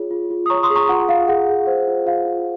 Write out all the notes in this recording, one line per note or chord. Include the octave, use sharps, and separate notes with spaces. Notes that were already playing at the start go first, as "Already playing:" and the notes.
Already playing: F4 G#4 C#5
F4
F4
D#6
C#5 A#5 C#6
C6 D#6
G#4
A#5 C#6
F4 F#5
F4 F5
G#4 F#5
G#4
C5
F4
F4 F5
F4